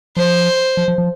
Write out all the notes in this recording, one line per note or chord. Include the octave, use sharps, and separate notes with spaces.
F3 C5
F3
F3
F3